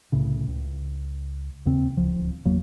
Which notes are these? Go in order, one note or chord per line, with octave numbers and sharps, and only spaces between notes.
C2 A2 C#3
C#2
D#2 C#3 C4
D1 C#2 F3
G1 E2 F#3 A#3